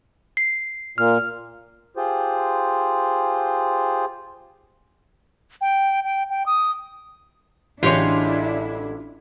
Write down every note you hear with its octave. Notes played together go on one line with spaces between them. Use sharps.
C7
A#2 F6
F4 G4 G#4 C5
G5
G5
G5
D#6
A1 D3 G#3 D4 E4 F4 G4 C#5